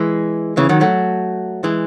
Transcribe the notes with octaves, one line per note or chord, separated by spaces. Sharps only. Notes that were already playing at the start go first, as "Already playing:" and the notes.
Already playing: E3 G#3
C#3 E3
D#3 F#3
F#3 A3
E3 G#3